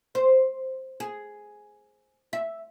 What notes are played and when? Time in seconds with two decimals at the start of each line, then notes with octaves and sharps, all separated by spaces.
0.15 C5
1.00 G#4
2.33 E5